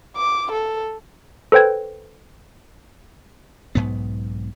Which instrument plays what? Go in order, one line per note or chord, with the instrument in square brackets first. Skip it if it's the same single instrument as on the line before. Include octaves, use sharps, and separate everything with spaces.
[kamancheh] D6
A4
[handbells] A4 B4 C5 G5 G#6
[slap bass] B1 G#2 B3